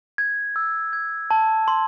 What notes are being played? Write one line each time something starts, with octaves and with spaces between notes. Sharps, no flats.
G#6
E6
G#6
A5
C6